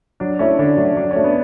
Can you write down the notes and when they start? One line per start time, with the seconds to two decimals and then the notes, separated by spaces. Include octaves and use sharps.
0.20 F#3 D4
0.39 A3 C#4 E4
0.59 D3 D4
0.77 F#3 A3
0.96 F#3 D4
1.11 C#4
1.16 A3 D4
1.24 B3